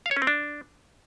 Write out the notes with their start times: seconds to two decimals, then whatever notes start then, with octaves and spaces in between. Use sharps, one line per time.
0.06 F5
0.11 C#5
0.16 C#4
0.22 C4
0.27 D4